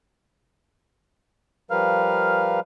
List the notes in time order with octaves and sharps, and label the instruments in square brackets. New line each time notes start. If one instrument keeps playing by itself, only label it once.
[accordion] F3 G3 A#4 B4 F5 F6